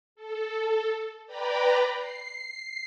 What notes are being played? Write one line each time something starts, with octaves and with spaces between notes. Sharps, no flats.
A4
B4 D5 G5 A#5 B5
C7